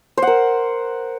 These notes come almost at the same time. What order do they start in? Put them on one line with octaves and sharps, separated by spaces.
C5 F#5 A#4